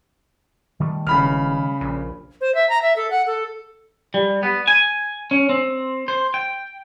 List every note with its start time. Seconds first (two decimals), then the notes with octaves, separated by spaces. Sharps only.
0.80 D#3 G3 A3
1.07 E1 C#3 B5 F6
1.81 A#1
2.41 C5
2.55 E5
2.69 A#5
2.82 E5
2.96 A4
3.11 F#5
3.26 A4
4.14 G3
4.43 B3
4.68 G#5
5.31 C#4
5.49 C4
6.08 C5
6.34 G5